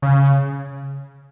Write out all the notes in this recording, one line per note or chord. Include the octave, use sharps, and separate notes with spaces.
C#3